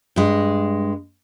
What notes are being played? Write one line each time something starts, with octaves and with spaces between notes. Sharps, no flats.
G2 G#3